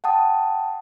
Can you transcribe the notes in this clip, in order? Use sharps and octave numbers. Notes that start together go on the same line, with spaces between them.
F#5 G5 A5 D#6